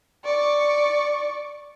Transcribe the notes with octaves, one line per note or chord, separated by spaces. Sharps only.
D5 C#6